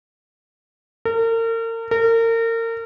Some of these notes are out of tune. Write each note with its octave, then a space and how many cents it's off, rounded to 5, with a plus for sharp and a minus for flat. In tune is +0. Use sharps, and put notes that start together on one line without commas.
A#4 -40
A#4 -35